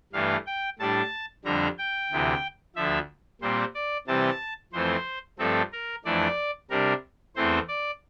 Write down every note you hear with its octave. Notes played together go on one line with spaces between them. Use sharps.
G2 E3 A3 F5
G5
A2 G3 D4 A5
F2 D3 G3 D4 A#5
G5
D2 C3 E3
D2 D3 F3 E5
A#2 G3 C4 C5
D5
C3 E3 G3 C4 A5
F2 E3 A3 C4 C5
G2 F3 A3 C4 A4
A#4
F2 E3 A3 D4 D5
C3 G3 D4 A#4
E2 E3 A3 C4 C5
D5